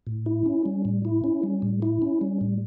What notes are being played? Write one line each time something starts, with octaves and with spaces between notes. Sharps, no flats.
A2
E4
C#4
G3
A2
E4
C#4
G3
A2
E4
C#4
G3
A2